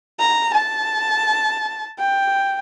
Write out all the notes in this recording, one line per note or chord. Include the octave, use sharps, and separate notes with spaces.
A#5
A5
G5